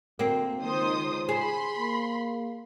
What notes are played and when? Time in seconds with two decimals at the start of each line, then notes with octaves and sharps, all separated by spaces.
0.19 D2 A#3 C4
0.59 C#2 D#3 C5 D#6
1.29 G#4 C5 B5 C6
1.78 A#3